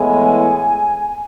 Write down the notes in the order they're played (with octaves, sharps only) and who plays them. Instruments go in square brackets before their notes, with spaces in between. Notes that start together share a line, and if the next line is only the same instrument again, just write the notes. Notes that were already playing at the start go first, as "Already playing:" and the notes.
Already playing: [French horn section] A2 E3 G#3 B3 E4 [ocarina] G#5